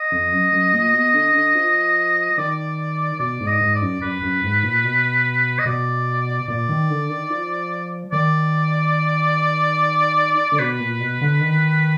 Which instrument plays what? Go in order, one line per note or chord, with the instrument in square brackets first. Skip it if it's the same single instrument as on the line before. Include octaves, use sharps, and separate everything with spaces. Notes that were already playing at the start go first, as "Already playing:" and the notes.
Already playing: [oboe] D#5
[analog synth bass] F2
F#2
F#2
A#2
B2
D3
D3
F3
[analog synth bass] D#3 [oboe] D5
[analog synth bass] B2 [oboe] D5
[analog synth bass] G#2
[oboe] D#5
[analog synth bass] G#2
[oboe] D5
[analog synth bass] F#2
[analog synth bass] F#2 [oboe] B4
[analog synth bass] F#2
G#2
A#2
B2
[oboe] D#5
[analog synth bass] B2 [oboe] D5
[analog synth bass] A#2 [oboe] D5
[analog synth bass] D#3
D3
D#3
F3
[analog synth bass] D#3 [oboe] D5
[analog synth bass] D3
[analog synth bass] B2 [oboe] B4
[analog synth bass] A#2
B2
D3
D#3